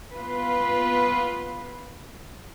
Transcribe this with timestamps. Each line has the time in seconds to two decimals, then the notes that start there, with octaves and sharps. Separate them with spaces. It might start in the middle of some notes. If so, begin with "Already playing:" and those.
0.14 B3 F4 B4